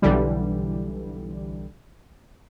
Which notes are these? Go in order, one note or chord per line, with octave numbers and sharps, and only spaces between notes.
B1 D3 E3 G3